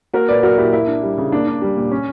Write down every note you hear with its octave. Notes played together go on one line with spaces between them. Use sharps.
A#3 F#4 A#4
A#2 B4 D5
F#3 F#4 A#4
A#2 E4 G4
A#3 E4
D4
G3
C#3
A#3 D4
D4
G3
A#2
C#4